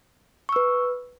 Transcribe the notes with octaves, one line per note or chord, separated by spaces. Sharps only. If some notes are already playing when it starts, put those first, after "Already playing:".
B4 C#6 E6